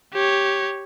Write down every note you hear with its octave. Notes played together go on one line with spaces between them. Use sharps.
G4 C#5